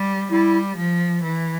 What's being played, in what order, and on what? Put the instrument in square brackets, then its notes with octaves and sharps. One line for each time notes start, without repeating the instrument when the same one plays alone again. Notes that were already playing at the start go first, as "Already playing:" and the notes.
Already playing: [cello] G3
[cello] G3 [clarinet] E4
[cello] F3
E3